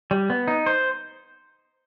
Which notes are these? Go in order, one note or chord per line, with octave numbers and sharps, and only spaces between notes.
G3
B3
D#4
C5